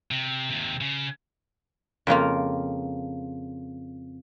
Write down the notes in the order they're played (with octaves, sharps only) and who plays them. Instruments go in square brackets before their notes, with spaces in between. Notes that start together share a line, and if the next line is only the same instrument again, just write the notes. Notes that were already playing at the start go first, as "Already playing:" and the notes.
[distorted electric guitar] C3
D#2 C3
C#3
[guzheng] F2 C#3 A#3 F4